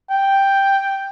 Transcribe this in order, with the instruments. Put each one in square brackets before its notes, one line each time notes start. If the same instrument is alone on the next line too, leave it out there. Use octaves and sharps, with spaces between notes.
[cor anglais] G5